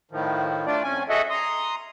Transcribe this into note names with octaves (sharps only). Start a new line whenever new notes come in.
A2 D#3 F3
A3 D4 F4 D5
F2 C#4 G#5
F#4 G#4 A4 D#5 E5 F#5
A#5 C6 D#6